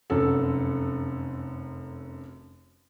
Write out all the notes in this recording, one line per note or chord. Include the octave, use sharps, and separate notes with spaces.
F1 F#2 A4